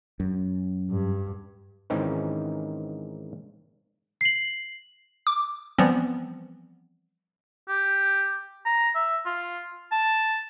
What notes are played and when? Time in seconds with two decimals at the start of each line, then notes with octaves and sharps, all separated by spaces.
0.20 F#2
0.90 G2
1.90 G#2 D#3 E3 C4 C#4 D#4
4.21 C7 F#7
5.27 D6
5.78 E3 F3 G3 B3 C4
7.68 G4
8.66 A#5
8.95 E5
9.26 F4
9.92 A5